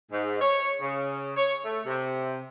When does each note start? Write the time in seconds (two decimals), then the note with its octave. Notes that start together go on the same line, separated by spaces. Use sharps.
0.12 G#2
0.41 C#5
0.82 C#3
1.36 C#5
1.64 A3
1.86 C3